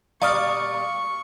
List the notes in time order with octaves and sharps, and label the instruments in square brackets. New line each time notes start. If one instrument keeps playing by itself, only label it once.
[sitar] A#2 G3 D5 [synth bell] F5 D#6 F6 [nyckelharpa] C#6